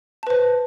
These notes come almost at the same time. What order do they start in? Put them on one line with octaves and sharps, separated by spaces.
A5 B4 C5